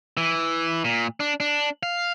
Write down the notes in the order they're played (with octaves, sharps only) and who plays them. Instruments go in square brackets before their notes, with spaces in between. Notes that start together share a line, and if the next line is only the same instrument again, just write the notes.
[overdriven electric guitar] E3
A#2
D4
D4
F5